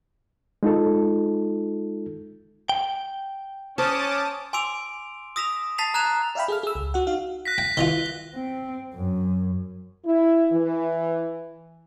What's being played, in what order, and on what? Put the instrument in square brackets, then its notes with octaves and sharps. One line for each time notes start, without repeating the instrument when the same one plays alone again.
[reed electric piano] G#3 D#4 F4 A4
[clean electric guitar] G5
[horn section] C#4 [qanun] C5 [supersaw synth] A5 D6 D#6
[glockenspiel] G#5 C6 D6 E6 D7 F7
D#6 E6 A#6 B6 E7 F7
A5 A6 B6 C7 F7
A#5 F#6 G#6 E7 F7
[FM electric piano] D5 E5 F5 G5 B5
G#4 A4 F6
G#4 E6
C#2
F#4 F#5
D#4 F#4 F5
[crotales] F#6 A#6 B6
[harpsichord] G5
[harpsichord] D#3 E3 F4 [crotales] G7
[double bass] C4
F#2
[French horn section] E4
E3